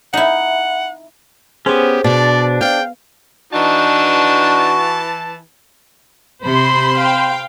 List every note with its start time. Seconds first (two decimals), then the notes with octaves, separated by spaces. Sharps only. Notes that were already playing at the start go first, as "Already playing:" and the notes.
0.13 D#4 E4 F#5
1.66 B3 C#4 G4 G#4 C5
2.04 B2 D4 D5
2.61 F5 G5
3.53 E3 D4 D#4 F#4 A5
6.44 C3 C5 B5 C6
6.95 F5 G5